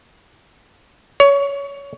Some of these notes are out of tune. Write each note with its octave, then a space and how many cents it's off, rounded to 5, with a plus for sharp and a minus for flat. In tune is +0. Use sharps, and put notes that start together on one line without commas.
C#5 +20